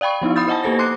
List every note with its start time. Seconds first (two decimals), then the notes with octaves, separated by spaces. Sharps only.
0.01 D5 F5 G5 B5 C#6
0.22 F3 B3 D#4 E4
0.36 B5 D#6 G6 A6
0.48 C5 D#5 F#5 G#5 A5
0.63 A#3 G4 A4 C5 A#6
0.79 C6 D6 F#6 C7